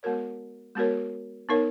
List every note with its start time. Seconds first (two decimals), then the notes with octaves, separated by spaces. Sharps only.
0.03 G#3 B3 F#4 A#4 C#5
0.75 G#3 B3 F#4 A#4 C#5
1.49 B3 D#4 A#4 C#5